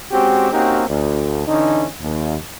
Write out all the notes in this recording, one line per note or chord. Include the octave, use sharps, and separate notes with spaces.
G#3 C4 C#4 F#4 G4
A#3 C4 C#4 D#4 F#4 G4
D2
D3 E3 C#4 D#4
D#2